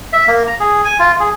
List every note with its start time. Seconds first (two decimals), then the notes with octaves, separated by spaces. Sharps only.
0.13 E5
0.28 A#3
0.47 A#5
0.60 G#4
0.85 G#5
0.99 F4
1.20 G#4